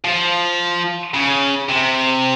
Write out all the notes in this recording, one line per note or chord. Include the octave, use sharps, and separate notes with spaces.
F3
C#3
C3